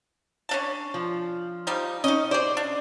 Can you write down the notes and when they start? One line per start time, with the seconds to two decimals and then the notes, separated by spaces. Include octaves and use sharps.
0.49 C#4 D4 A5
0.94 F3
1.67 F3 G3 D#4
2.04 C#4 D#4 D#5
2.31 G#4 C5 D5
2.57 D4